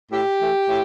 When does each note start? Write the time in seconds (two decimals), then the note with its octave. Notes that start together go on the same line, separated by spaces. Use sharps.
0.12 A2 G4
0.41 E3 A3
0.69 A2